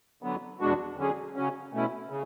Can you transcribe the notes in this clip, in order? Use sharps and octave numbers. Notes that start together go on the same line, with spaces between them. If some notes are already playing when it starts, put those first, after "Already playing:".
D3 F#3 B3
E2 B2 G#3 D4 F#4
D3 F#3 C#4 G#4
C#3 F#3 C#4
B2 A3 C#4 E4
C#3